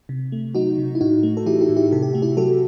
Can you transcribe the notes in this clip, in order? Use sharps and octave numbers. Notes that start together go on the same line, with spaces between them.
C3
A3
F#3 D#4 F#4
C3
E4
A2 D#4 F#4
A3
A4
E3 E4 G4
E4 G4
A2
E4 G4
C3 A4
G4
A3 F#4
E4 G4
F#3 F#4 A4